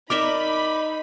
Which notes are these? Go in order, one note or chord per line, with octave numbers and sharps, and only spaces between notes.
D#4 A#4 D5 E5 B5 D6